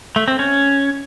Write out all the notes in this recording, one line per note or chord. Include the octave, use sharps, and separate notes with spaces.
A3
C4
C#4